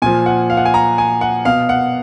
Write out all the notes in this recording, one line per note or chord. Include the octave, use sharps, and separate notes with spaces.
A#2 F3 G#5
F#5
F5
F#5
G#5
A#5
G#5
F#5
B2 F5
F#5